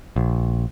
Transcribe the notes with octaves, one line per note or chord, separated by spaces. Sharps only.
A#1